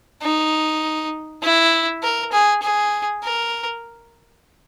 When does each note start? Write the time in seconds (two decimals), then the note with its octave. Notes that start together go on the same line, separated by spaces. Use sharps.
0.22 D#4
1.43 E4
2.03 A#4
2.32 G#4
2.62 G#4
3.23 A#4